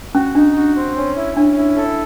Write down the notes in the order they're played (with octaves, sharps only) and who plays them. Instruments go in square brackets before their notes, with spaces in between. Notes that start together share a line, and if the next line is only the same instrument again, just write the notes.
[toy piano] C#4 [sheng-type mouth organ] F#4
[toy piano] D4 [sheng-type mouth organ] D#4
[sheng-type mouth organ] F#4
C4
C#4
E4
[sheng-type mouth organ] C#4 [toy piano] D4
[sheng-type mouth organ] E4
A4